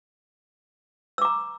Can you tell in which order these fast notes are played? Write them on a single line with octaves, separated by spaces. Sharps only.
E6 D6 A#5